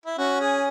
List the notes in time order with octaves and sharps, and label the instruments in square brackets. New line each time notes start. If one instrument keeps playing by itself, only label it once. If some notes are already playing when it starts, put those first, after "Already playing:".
[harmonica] E4
[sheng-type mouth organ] C#4 [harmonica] F#4
[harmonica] G#4